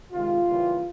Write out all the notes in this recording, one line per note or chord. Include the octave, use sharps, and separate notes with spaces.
C3 D#3 G#3 F4
C#3 E3 G3 A#3